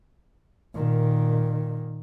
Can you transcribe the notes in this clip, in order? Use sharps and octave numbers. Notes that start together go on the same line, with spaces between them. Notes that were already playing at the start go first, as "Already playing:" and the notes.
A#2 D#3